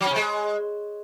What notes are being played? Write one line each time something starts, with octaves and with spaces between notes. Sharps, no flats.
F#3
C#4
C3
G#3